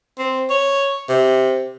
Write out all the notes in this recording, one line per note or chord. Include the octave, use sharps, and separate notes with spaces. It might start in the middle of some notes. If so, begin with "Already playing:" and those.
C4
C#5
C3